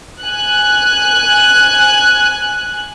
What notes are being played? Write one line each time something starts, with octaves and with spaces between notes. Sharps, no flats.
G#5 F#6